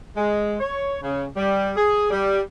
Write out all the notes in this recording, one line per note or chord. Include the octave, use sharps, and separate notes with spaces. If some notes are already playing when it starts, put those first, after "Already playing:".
G#3
C#5
C#3
G3
G#4
G3